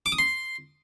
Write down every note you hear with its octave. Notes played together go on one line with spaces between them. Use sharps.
D6
D#6
C6